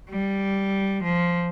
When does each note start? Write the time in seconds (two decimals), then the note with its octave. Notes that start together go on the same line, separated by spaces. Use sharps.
0.10 G3
1.04 F3